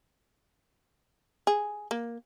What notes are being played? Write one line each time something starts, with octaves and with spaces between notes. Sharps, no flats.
G#4
A#3